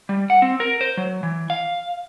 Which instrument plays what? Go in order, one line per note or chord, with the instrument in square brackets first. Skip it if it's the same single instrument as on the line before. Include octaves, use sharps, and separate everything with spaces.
[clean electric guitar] G3
F#5
C4
A#4
C5
F#3
E3
F5